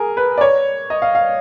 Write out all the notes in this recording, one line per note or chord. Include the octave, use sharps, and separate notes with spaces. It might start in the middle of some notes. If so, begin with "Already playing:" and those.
Already playing: G#4 A#4
B4
D5
C#5
D#5
F5
F5